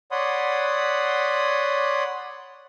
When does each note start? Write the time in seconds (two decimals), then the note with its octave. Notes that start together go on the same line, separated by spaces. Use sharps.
0.11 C#5 D5 F#5 B5 C6 D#6